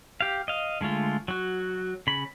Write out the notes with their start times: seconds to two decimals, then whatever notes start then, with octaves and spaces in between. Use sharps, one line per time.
0.21 G4 F5
0.48 D#5 F5
0.81 D3 G#3 A3 F4
1.28 F#3 F#4
2.07 C#3 B5